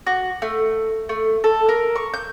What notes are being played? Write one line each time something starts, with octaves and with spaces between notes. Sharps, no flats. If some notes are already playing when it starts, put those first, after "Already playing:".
F#4
A3
A3
A4
A#4
C#6
G6